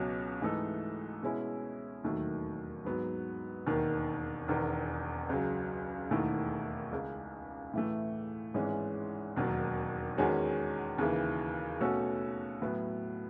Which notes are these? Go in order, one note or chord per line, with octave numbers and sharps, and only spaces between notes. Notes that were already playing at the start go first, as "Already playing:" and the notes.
Already playing: C#2 B2 F#3 C#4 F#4
G#2 E3 A3 D#4 A4
B2 G#3 C#4 E4
E1 D#2 D#3 F#3 A3
G#2 F#3 B3
E1 D#2 D#3
E1 E2 D#3
C#2 C#3 F#3
E1 D#2 D#3 A3 E4
C#2 C#3 G#3
A2 E3 A3
G#1 G#2 E3 G#3 C#4
E1 D#2 D#3 F#3
E2 D#3 G#3 C#4 F#4
D#2 C#3 E3
B2 A3 C#4 F#4 A4
A2 F#3 B3